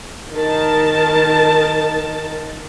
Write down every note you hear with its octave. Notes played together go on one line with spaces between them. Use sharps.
D#3 A#4 A5